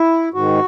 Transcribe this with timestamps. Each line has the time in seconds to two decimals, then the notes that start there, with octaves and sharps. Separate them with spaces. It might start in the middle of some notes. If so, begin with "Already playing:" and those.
Already playing: E4
0.34 G#2 D#3 F#4